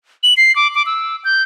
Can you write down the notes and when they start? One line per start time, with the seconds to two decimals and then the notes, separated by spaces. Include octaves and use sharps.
0.23 F#7
0.37 C7
0.56 D6
0.75 D6
0.86 E6
1.25 G6